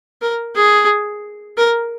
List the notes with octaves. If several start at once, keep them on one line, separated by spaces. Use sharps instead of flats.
A#4
G#4
A#4